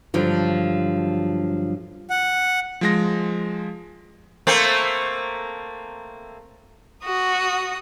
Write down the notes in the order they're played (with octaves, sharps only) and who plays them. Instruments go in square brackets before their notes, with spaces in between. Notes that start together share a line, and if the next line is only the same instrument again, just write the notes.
[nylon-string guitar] G2 D3 F3 F#3
[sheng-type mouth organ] F#5
[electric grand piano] F3 G#3 A#6
[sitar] A3 A#3 C4
[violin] F#4 D#6